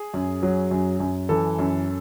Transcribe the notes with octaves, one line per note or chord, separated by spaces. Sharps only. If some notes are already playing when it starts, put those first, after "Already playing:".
Already playing: G#4
F#2
F#3
F#2
F#2
E3 A4
F#2